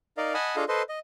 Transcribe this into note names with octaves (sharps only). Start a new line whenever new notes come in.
D#4 A#4 D5 D#5 F5
D#5 F#5 G#5 A5 B5 D#6
D4 F4 G#4 A4 D#5 F5
A4 B4 C5 D#5 C6
D#5